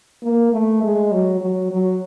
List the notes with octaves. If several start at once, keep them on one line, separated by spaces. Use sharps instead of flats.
A#3
A3
G#3
F#3
F#3
F#3